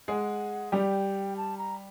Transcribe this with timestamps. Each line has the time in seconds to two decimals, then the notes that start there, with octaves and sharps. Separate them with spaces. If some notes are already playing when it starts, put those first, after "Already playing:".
0.08 G#3 G#4 F#5
0.72 G3 G4 G5
1.37 A5
1.58 A#5